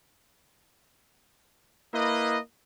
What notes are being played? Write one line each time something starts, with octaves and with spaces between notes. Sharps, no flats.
A#3 E4 B4 D#5